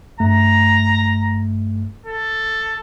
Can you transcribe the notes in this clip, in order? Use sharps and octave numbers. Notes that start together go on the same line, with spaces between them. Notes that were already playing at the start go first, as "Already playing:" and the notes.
G2 A3 A#5
A4